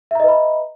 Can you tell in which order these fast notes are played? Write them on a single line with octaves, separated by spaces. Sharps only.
E5 A#5 D#5 B4 B5